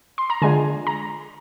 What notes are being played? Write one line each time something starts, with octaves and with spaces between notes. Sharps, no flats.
C6
A#5
D3 G#3 D4 F4 G#5
A#5